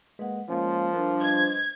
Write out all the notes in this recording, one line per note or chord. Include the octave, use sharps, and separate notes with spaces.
G#3 A#3 B4 F#5
F3 G#3 A#3 C#4 C6
G3 D4 A#4 B4
B4 C5 D#5 G#6